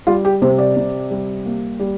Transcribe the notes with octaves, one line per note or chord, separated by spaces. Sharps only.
G3 F4
G4
C3 C5
D5
C3
G3
A#3
G3